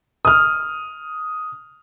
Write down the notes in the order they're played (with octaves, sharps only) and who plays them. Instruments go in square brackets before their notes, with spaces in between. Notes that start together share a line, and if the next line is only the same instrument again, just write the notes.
[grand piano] D#6 F6